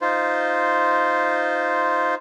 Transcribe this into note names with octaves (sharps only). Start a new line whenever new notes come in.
D#4 F4 C5